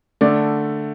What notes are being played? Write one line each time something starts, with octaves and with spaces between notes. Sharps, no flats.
D3 A3 D5